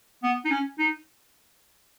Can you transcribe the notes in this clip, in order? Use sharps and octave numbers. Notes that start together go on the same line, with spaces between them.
B3
D#4
C#4
D#4